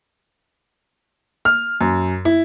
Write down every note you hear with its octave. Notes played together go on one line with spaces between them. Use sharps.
F6
F#2
E4